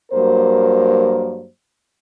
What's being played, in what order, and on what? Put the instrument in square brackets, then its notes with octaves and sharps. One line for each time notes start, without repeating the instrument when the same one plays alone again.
[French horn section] G2 F#3 A#3 A#4 C5